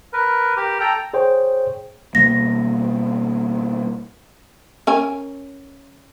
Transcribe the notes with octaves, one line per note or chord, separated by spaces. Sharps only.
A#4 B4
G4 A#4
A4 G5 A#5
G#4 C5 C#5 G5
B2 G3 A#3 A#6
C#4 A#4 G#5